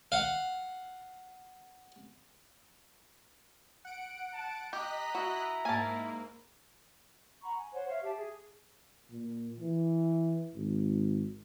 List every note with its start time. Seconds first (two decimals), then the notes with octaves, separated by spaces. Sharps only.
0.12 F5 F#5
3.85 F#5 D7
4.33 A5
4.73 G4 D#5 A#5 F#6 B6
5.15 E4 F#4
5.65 G#2 A#3 G#5 A5
7.43 F#5 A#5 B5 C#6
7.57 G#5
7.73 C5 C#5 F#5
7.89 C#5 E5 F5
8.03 G4 E5 A5
8.18 G#4
9.11 A#2
9.59 E3
10.54 G#1